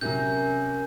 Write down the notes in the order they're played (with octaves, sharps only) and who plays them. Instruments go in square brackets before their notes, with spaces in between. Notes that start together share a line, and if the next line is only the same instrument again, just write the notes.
[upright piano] C3 F#3 [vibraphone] C#4 A#4 G#5 [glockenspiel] G6